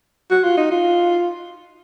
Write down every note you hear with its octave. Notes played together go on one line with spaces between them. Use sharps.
F#4
F4
D#4
F4